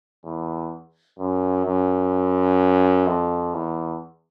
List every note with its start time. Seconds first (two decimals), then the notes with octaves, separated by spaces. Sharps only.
0.24 E2
1.19 F#2
1.65 F#2
3.07 F2
3.54 E2